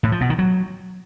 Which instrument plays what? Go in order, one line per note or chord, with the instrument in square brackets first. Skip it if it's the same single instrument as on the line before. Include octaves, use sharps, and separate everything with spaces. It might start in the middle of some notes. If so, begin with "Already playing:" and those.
[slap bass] A2
F3
B2
D#3
F#3